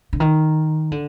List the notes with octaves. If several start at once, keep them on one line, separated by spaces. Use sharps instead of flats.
D3
D#3
D3